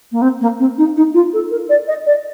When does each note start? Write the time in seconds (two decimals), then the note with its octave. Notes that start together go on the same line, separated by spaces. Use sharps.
0.12 A#3
0.22 C4
0.41 A#3
0.59 C4
0.78 D#4
0.96 D#4
1.14 F4
1.33 A4
1.51 A#4
1.69 D5
1.88 D#5
2.06 D5